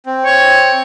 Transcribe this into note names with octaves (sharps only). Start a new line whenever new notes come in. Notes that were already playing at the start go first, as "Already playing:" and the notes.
C4
C#5